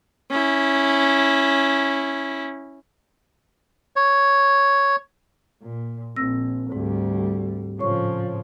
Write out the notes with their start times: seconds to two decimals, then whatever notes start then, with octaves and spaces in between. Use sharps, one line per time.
0.31 C#4 E4
3.96 C#5
5.62 A#2
6.16 A#1 C4 E6 A#6
6.72 D2 G#2 G3
7.80 A2 C#3 F3 C#5 C#6